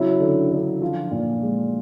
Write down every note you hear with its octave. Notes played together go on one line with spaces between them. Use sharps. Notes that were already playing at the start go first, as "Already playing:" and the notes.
Already playing: C#3 F#3 E4
D3
D3
F3 F4
A#2
G#3